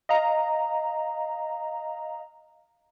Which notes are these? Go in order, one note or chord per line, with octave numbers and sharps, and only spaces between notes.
D#5 F5 A#5